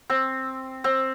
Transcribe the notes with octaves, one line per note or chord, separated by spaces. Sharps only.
C4
C4